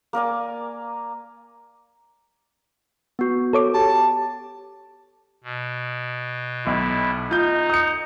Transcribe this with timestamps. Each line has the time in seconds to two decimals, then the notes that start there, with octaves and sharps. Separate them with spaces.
0.13 A#3 A#4 D5 G#5
3.19 B3 F#4
3.53 A4 C#5 D6
3.74 G4 A5
5.44 B2
6.67 B1 E4
7.31 D#4 F4 G6
7.70 D#6 C#7